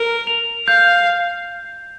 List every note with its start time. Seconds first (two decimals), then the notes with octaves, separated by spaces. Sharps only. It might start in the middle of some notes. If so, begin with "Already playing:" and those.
Already playing: A#4
0.27 F7
0.68 F5 G6